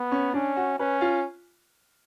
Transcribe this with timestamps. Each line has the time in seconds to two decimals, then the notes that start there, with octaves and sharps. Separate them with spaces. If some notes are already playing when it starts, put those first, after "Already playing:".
Already playing: B3
0.12 C#4
0.33 C#4 D4
0.56 F#4
0.79 C#4 B4
1.01 F4